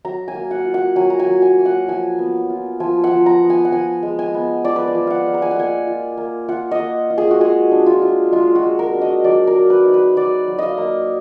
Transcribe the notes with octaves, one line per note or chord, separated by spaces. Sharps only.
F#3 A#5
G#5
A#3
F#5
F4
F#5
F#3 G#5
A#5
G#5
F#3
G#5
A#3
F#5
F3 G#5
B3
F4
F3 G#5
F#5
F3
A#5
B3
G#5
F#5
F3 G#5
G#3
G#5
B3
F3 D5
B4
D5
F3
F5 F#5
G#3
A#5
G#5
F#5
A#3 G#5
F4
A#3
F4 F#5
D#5
A#3
F4
G#4
F#4
G#3 G#4
D4
F4
F4
G#3 F4
F#4
G#3
A#4
D4
D#5
F#3 D5
A#4
A#3
B4
D#4
B4
F#3 D5
F#3
D#5 F5
A#3